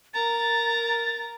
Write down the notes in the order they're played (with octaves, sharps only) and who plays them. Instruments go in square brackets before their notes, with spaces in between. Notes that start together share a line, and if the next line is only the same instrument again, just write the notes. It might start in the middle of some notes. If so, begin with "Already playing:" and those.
[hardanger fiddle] A#4 A#5 [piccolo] A6